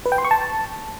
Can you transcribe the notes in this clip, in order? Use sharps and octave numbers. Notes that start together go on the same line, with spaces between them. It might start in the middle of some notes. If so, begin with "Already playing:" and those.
B4
G5
C6
C#6
A5